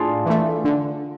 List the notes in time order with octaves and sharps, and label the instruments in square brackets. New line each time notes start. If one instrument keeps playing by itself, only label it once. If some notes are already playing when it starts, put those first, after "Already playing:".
Already playing: [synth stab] A2 [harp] D4 F4 G#4
[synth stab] E3 A3
D3